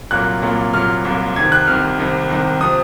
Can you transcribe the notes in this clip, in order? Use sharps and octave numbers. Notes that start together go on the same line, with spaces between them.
C2 A#2 F#3 A#3 F#6
C2 A#2 F#3 A#3
C2 A#2 F#3 A#3 F6
C2 A#2 F#3 A#3
C2 C3 D#3 G#6
F#6
C2 C3 D#3 F6
C2 C3 D#3
C2 C3 D#3
C3 F3 D#6